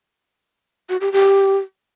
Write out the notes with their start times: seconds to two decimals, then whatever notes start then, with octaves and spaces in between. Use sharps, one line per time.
0.89 F#4
1.01 G4
1.12 G4